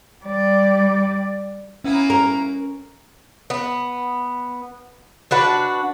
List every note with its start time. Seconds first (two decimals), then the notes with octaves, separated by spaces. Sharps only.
0.24 G3 D5
1.84 A#3 B3 C#4 E4
2.10 A#4
3.50 B3
5.31 D4 F#4 B4